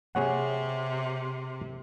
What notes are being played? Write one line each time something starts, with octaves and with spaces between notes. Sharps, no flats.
C3 G#4 C#5 F#5